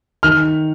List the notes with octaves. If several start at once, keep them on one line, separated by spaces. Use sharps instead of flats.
D#3 F6